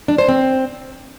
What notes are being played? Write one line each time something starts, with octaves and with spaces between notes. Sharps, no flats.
D4
C5
C4